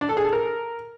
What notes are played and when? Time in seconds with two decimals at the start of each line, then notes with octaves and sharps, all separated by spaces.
0.01 D4
0.09 A4
0.17 G#4
0.25 A4
0.33 A#4